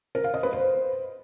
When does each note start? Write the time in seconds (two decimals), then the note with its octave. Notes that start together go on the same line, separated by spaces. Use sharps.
0.15 A#4
0.24 F5
0.34 D#5
0.43 B4
0.53 C5